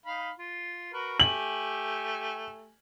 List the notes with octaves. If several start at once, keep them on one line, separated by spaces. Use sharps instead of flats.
D#4 F5 B5
F4
F#4 A#4 B4
A3 G4 G#5 F#7